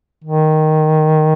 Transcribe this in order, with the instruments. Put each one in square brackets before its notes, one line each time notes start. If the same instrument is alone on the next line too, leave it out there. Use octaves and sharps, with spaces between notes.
[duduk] D#3